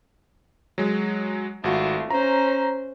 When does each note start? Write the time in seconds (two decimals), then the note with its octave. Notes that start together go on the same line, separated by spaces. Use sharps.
0.78 F#3 G#3
1.64 G#1 A3 F4 F#4
2.11 C#4 C5 A#5